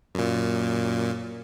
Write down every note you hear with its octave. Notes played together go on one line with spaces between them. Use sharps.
F#2 A#2